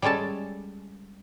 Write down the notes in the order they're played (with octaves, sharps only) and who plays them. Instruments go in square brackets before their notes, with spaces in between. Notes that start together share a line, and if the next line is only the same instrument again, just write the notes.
[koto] G3 G#3 C#4 A4 A5